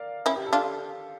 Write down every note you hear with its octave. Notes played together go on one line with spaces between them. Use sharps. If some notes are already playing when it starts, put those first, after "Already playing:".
Already playing: A#4 D5 F5
C#4 E4
G4
A4
D4 F4